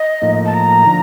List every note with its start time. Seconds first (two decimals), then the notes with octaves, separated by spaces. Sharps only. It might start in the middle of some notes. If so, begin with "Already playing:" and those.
Already playing: D#5
0.22 A2 F3 A#3 D#4
0.45 A5
0.54 A#5
0.86 D3 F3